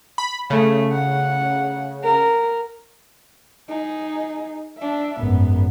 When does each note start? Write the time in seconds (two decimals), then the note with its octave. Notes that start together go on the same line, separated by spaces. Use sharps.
0.18 B5
0.50 C#3 A3
0.93 F#5
2.04 A#4
3.69 D#4 G#4
4.78 D4 E5
5.19 G#1 F#2 B3